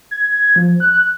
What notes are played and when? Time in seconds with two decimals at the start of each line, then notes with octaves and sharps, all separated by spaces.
0.11 G#6
0.56 F3
0.80 F#6